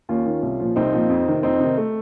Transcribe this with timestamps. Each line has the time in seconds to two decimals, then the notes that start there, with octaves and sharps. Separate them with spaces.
0.09 D#2 C#4 F4
0.26 D#3
0.43 C2
0.60 A#2 F3
0.76 C2 C4 D#4
0.93 A#2 F3
1.10 F2
1.27 C3 D#3
1.43 F2 C4 D#4
1.60 C3 D#3
1.77 A3